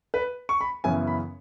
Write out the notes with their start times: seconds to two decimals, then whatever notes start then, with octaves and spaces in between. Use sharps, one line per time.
0.14 B4
0.49 C#6
0.61 B5
0.84 F#2 C#3 E3 B3 E4 G#5
1.07 B5